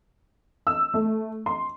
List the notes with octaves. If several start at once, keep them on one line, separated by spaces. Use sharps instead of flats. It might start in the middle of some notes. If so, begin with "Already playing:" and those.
E6
A3
C6